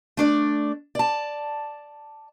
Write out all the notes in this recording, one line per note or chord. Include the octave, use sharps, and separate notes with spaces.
A3 D4 D5
D5 A5